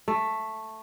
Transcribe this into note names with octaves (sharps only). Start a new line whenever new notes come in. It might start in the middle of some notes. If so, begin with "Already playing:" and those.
A3